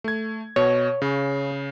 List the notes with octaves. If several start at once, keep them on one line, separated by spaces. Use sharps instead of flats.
A3 G#6
B2 C#5
C#3